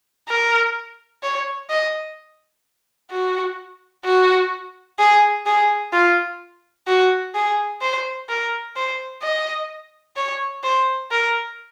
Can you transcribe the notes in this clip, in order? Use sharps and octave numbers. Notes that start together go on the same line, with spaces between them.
A#4
C#5
D#5
F#4
F#4
G#4
G#4
F4
F#4
G#4
C5
A#4
C5
D#5
C#5
C5
A#4